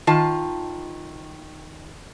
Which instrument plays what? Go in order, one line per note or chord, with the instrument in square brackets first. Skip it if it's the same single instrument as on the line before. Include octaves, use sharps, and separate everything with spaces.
[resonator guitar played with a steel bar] D#3 F4 A5